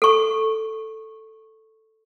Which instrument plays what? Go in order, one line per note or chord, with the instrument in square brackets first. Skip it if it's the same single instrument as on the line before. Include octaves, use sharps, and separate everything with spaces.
[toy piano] A4 C#6